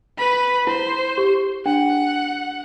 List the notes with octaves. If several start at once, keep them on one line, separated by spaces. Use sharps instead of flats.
B4 B5
E4 C5
G4
D4 F#5